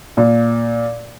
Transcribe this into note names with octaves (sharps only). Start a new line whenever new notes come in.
A#2